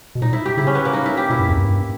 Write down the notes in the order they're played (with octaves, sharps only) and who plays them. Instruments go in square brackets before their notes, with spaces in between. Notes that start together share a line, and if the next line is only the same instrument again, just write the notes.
[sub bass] B2
[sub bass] A#2 [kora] D#4
[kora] E4
G4
[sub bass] C#3 [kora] E4
[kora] C#4
B3
A#3
D#4
E4
G4
[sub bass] B2 [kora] E4
[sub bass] G2
E2
G2